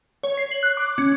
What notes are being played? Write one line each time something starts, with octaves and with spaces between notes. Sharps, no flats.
C#5
C7
F#7
F#6
D6
C#4